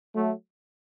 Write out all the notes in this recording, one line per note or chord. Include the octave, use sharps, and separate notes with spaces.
F#3 A3